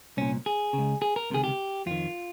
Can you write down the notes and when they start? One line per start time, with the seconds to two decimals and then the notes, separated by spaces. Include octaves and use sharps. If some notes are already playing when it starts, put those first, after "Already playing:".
0.17 C2 A#2 C#4
0.46 G#4
0.73 C#3
0.78 C#2
1.02 G#4
1.16 A#4
1.30 C#2 C3 D#3 G#4
1.44 G4
1.86 F2 D#3 F4